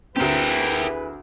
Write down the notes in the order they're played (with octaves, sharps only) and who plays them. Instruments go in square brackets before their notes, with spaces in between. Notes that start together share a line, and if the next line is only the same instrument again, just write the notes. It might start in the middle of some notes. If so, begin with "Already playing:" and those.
[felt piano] D2 C4 [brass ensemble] E4 G#4 B4 [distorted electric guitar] G4 A#4